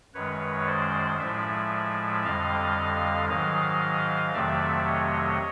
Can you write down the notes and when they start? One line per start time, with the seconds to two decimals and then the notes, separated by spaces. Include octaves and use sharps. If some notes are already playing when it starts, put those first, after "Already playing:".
0.14 F#2 D#3 G#3 B4 C#5
0.67 C5 D5
1.19 A2 F3 G#3 D5 E5
2.24 F2 D3 G3 D#5 F5
3.29 G#2 D#3 F#3 D#5 F5
4.34 F2 C3 D#3 F#3 A3 D5 E5
4.86 C#5 D#5